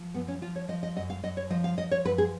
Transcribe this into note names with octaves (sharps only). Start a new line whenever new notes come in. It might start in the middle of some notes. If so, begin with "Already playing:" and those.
Already playing: F3
F#2 B3
C#4
F3 F4
C#5
F3 D#5
D#5
F#2 D#5
F5
F#2 D#5
C#5
F3 D#5
F5
F3 D#5
C#5
F#2 B4
G#4